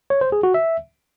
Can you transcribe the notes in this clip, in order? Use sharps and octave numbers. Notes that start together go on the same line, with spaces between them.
C#5
C5
G#4
F#4
E5